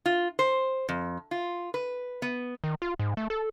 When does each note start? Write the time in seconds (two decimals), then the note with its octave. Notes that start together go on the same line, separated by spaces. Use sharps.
0.06 F4
0.39 C5
0.89 F2
1.31 F4
1.74 B4
2.22 B3
2.64 D#3
2.82 F4
2.99 G#2
3.17 A3
3.30 A4